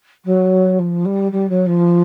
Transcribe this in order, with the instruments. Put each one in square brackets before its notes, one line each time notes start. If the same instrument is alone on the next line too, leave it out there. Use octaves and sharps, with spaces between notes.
[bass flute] F#3
F3
G3
G3
F#3
F3